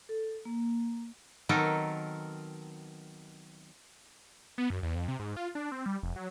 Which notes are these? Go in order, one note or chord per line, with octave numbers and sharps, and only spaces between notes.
A4
A#3
D#3 F#3 B3 C4 A4 A#4
B3
F#2
E2
F2
C3
G#2
F4
D4
C4
G3
F1
F#3